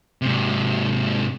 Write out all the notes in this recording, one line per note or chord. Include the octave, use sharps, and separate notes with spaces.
G#2 C3